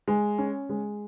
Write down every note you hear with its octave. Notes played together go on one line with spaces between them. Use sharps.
G#3
C#4
G#3